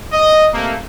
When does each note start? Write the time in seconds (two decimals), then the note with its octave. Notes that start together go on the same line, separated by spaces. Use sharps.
0.12 D#5
0.54 C3 A3 A#3